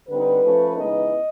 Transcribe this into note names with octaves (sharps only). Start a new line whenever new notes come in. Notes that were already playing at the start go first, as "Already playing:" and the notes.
D3 G3 C4 D#4 B4
F3 A3 C#4
C#3 E3 G#3 B3 D#4 D#5